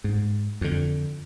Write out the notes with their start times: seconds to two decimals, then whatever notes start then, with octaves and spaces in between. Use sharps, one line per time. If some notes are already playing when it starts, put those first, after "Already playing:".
0.04 G#2
0.61 F2 D3